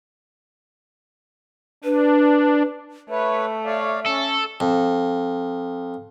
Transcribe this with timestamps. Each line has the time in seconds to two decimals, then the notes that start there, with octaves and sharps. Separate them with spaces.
1.84 D4 B4
3.10 A3 B4 C#5 E5
3.65 C#5 D5 F5
4.06 C#4 A4
4.60 F2